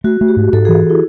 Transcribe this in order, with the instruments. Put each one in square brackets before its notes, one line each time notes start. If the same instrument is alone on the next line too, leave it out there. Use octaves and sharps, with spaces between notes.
[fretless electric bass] A3 [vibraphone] F#4
[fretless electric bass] A3
[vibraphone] G4
[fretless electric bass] G#2
[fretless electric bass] G#2 [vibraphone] A4
[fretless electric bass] E3 [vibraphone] G#4
[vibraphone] E4